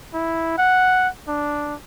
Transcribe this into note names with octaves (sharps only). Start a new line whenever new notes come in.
E4
F#5
D4